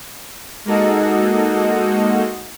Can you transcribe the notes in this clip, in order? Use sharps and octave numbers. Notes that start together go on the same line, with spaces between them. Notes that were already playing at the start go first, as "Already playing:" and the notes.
G#3 A#3 D#4 F#4 A4 D#5